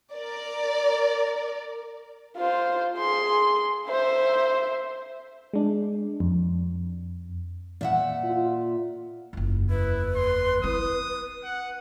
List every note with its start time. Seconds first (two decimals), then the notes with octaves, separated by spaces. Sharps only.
0.12 A#4 D5
2.37 F4 C5
2.98 G#4 C6
3.87 C5 E5
5.54 G#3 D4
6.20 F2
7.81 A#2 E5 F#5
8.24 F4
9.33 F#1 E2
9.70 E4 B4
10.16 C6
10.63 C4 E4 D#6
11.44 F#5